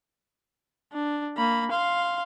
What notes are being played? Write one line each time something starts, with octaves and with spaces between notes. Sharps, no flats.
D4
A#3 B5
F5 C6